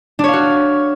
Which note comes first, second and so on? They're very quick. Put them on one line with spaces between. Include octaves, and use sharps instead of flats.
D4 C#5 F5 F#4